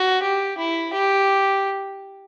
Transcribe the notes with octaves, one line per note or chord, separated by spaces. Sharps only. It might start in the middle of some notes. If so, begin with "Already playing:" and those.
Already playing: F#4
G4
E4
G4